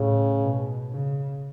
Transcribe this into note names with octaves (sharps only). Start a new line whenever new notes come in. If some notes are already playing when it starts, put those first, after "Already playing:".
Already playing: A2 C#3
B2
C#3